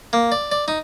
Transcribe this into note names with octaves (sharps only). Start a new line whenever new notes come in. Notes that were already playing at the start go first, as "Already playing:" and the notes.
A#3
D5
D5
D#4